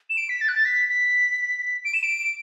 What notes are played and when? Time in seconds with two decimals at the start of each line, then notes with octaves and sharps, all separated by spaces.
0.10 E7
0.17 D7
0.29 B6
0.41 A6
0.48 F#6
0.55 A6
0.65 B6
0.89 B6
1.85 D7
1.94 E7
2.03 D7